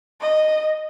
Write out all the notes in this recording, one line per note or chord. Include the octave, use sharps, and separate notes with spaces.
D#5